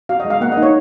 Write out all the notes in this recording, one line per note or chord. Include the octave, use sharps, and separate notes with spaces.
F#4 F5
D#5
G#3
F5
A#3 F#5
D#5
D#4
C#5